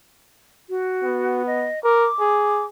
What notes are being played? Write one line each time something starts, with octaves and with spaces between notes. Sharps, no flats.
F#4
B3
D#5
A#4 D6
G#4